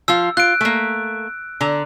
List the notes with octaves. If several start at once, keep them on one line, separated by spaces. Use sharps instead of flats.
F3 F4 E6
F4 F#6 D7
A3 A#3
D3 A#5